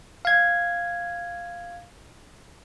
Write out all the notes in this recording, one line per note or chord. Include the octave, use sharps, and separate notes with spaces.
F5 G#6